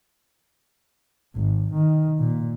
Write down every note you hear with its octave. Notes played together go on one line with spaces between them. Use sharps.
G#1
D#3
A#2